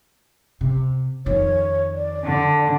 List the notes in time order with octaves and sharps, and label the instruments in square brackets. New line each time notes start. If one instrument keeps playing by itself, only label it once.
[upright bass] C3
[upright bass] F2 D#3 [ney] C#5
[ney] D5
[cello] D3